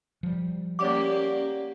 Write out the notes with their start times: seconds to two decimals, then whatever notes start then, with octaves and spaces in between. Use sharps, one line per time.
0.23 F3 G3
0.79 A#3 C#4 G4 C#5 D5 F#5 D6